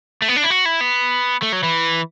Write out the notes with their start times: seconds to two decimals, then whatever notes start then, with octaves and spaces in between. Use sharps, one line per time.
0.22 A3
0.28 B3
0.36 D4
0.43 E4
0.50 F#4
0.65 E4
0.81 B3
1.42 A3
1.52 F#3
1.63 E3